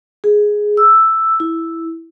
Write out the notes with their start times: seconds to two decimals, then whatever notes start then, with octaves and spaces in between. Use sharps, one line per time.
0.24 G#4
0.77 E6
1.40 E4